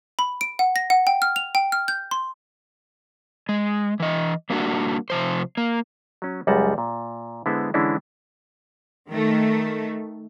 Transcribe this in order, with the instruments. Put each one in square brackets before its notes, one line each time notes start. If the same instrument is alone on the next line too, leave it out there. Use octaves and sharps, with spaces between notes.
[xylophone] B5
D7
F#5
A#6
F#5
G5
F6
F7
G5
F6
G6
C6
[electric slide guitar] G#3
E3 D#5
G3 A#3 D4 F#4
C3 F3 C5
A#3
[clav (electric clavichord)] F#3 C#4
C#2 F#2 G3 G#3 F#5 A5
A#2
D3 G#3 B3 E4 C5
D3 E3 G#3 C#4 D4 E4
[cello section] D#3 A3